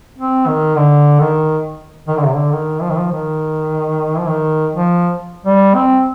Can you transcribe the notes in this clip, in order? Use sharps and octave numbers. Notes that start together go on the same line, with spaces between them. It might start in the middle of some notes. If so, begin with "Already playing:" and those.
C4
D#3
D3
D#3
D#3
D3
C3
D3
D#3
F3
D#3
F3
D#3
F3
D#3
F3
G3
C4